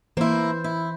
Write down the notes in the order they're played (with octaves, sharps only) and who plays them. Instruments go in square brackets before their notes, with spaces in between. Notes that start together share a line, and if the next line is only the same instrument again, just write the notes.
[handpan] E3 C5 [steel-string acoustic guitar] A#3 E4
[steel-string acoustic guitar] E4